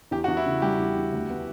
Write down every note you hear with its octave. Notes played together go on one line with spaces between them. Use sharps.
E2 G4
F#4
E2
E4
C#3
G3 G4
E2
E2
D2
B3